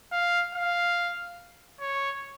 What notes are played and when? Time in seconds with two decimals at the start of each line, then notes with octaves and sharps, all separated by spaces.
0.12 F5
0.55 F5
1.80 C#5